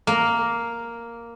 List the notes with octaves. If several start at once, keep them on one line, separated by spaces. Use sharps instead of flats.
A#3